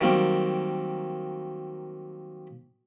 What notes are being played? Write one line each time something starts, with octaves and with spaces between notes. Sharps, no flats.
D#3 F#3 G3 A#3 C4